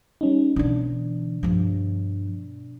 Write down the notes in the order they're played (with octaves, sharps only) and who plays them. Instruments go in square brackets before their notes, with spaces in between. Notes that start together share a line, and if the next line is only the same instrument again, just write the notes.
[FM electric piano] G3 C#4 D#4
[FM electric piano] B2 D4 [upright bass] D3 E3
[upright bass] G2 F3